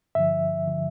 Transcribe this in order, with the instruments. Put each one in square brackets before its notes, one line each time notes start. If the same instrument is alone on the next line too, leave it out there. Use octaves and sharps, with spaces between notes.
[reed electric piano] G2 D3 F3 E5
D3 F3